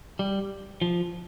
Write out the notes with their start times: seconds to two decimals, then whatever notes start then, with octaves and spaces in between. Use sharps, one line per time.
0.19 G3
0.82 F3